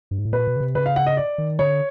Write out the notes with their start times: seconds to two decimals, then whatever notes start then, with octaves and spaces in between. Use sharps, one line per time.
0.11 G2
0.18 G#2
0.25 A2
0.33 A#2 B4
0.47 B2
0.56 C#3
0.61 C3
0.75 C#3 B4
0.86 F5
0.96 F#5
1.06 D#5
1.17 D5
1.38 D#3
1.59 D3 C#5